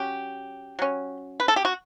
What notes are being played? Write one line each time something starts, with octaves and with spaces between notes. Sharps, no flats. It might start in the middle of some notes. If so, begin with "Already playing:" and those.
Already playing: F#3 C#4 G4
F#3 C#4
B4
A4
G4
F#4